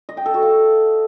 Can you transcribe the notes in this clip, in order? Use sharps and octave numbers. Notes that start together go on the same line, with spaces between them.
D#5
G5
A4
F#4
F5